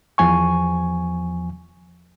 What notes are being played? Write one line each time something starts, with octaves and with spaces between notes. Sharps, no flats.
E2 F3 G#5 C#6